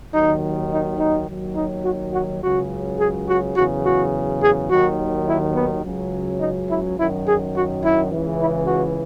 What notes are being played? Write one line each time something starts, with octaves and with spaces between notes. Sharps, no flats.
D#2 D#3 F#3 D#4
D#4
D#4
D#2 D#3 F#3
D#4
F#4
F#4
C#2 C#3 F#3 F#4
G#4
F#4
E2 C#3 F#3 F#4
F#4
G#4
D#2 D#3 F#3 F#4
E4
B3
C#2 C#3 F#3
D#4
E4
F#2 D#3 F#3 E4
G#4
F#4
E4
C#2 C#3 E3
E4
F#4